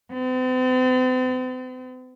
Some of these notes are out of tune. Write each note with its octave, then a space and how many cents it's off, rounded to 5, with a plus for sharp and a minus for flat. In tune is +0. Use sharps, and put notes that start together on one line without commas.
C4 -45